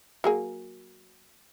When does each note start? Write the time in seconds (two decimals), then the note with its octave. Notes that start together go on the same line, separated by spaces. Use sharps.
0.24 F#3 A#3 G#4